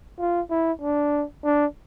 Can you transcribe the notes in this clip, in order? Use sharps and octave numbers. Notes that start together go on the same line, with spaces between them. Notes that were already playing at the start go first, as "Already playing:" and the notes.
F4
E4
D4
D4